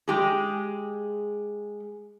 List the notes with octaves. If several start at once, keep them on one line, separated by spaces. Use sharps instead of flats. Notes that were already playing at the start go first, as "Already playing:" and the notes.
G#3 G4 G#4